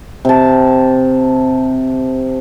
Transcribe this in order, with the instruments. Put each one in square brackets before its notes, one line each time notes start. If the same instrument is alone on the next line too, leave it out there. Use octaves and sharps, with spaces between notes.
[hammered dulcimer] C3 A5